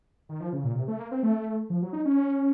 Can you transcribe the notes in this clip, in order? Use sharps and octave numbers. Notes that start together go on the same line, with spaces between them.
D#3
F3
C#3
A#2
C3
A3
A#3
C4
A3
F3
F#3
D#4
C#4